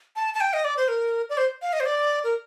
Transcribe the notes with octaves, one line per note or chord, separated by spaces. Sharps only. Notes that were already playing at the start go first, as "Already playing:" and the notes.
A5
A5
G5
D#5
D5
C5
A#4
D5
C5
F5
D#5
C5
D5
A#4